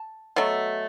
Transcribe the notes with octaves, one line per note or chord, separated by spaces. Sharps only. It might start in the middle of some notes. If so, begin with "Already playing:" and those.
Already playing: A5
B2 F#3 A3